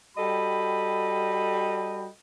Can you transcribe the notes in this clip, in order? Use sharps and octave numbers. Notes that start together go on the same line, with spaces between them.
G3 F#4 A4 D#5 G5 B5